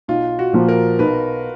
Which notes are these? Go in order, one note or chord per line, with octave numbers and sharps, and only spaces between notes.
B1 F4
F#4
A#2 F3 A#3
A#4
B1 B4